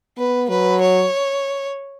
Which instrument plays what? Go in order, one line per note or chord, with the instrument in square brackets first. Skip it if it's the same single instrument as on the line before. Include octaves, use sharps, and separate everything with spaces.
[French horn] B3 [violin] B4
[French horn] F#3 [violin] B4
[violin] C#5